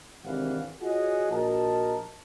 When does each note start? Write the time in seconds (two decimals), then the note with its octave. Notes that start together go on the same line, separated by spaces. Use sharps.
0.24 G#1 C3 E3 D4 F5 F#5
0.81 F4 F#4 G#4 C#5 D#5 F#5
1.30 A#1 F#4 A#4 D#5 A5